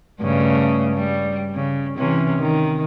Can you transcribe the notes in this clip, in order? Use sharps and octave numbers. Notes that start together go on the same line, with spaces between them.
G2 C#3 A3
G3
C#3
C3 E3 C#4
D#3